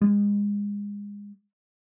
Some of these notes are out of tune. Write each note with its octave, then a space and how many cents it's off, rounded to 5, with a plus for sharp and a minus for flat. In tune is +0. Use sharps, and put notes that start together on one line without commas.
G#3 -30